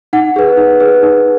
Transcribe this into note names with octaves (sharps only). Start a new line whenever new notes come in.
D#4 F#5
G#4 B4
D#4
G#4 B4
D#4